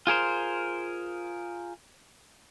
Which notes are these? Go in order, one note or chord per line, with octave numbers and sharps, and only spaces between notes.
F4 G#4 A#4 C5